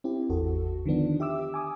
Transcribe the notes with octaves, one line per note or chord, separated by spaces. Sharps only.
C4 E4 G4
G#1 E2 F#4 A4
D3 D#3 F3 B3 D4
G4 E5 D6 E6
G#5 D6 D#6